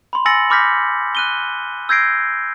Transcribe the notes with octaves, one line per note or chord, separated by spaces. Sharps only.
B5 C6
G#5 E6 A6 A#6 C#7 F#7
B5 D6 F6 G6 A#6 B6
F#6 D#7 G7
E6 G6 G#6 A#6 C7 D7